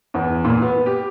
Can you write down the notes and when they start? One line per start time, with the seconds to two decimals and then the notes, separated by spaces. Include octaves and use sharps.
0.14 E2
0.44 A#2
0.62 B3
0.86 G4